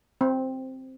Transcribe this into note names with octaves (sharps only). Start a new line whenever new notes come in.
C4